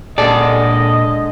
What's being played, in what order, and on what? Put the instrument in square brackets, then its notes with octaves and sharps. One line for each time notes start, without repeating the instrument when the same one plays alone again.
[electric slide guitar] A#2 A4 G#5 [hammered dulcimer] D3 G#3 A5 [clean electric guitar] D5 [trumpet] D#5